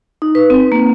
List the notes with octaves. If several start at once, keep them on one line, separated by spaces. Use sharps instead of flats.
D#4
B4
C4
A#3